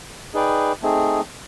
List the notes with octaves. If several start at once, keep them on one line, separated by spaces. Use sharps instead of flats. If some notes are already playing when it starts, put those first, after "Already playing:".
D#4 G#4 B4 D5 G5
A3 C4 D#4 G#4